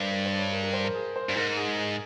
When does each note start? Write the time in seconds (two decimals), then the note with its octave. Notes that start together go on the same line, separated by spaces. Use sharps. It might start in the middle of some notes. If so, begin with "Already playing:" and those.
Already playing: G2 A#4 C5
0.11 A#4
0.25 C5
0.39 C#5
0.53 A#4
0.63 A#4
0.73 C5
0.84 A#4
0.94 G#4
1.16 C5
1.29 G2
1.36 G#2 A#4
1.57 G#4
1.78 G#4